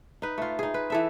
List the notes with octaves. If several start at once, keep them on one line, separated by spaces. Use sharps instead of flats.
D#4 B4
A3 F4
D#4 G#4
B4
E3 A4 E5